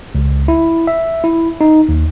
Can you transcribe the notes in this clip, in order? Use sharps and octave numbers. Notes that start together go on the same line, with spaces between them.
C#2
E4
E5
E4
D#4
D#2